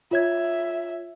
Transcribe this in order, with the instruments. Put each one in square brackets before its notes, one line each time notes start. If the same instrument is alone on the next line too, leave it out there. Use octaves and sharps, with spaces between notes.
[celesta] F4 C#5 G#6 [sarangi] E5